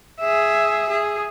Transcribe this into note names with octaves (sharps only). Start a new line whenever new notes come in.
G#4 E5
G#4